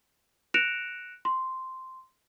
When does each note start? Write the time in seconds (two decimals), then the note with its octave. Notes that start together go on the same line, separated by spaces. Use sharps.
0.54 F#6 A#6 C#7 D7 E7 F7
1.25 C6